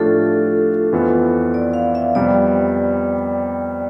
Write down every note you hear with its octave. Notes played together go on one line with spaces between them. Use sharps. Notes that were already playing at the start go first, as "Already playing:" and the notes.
Already playing: A2 F3 A3 D4 F4 G4 A4
F2 E3 B3 F4 A4
D5
F5
E5
F2 C3 G3 B3 D5